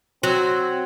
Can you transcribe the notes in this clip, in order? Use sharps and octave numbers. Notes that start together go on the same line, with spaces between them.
F#3 C4